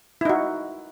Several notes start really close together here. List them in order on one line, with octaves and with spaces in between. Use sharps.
E4 D#4 F#4